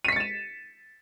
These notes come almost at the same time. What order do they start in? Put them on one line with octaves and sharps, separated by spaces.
D#7 B6 C#7 A6 E7